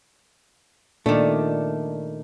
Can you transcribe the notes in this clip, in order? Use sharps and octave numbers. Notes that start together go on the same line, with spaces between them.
A#2 D#3 A3 D4 D5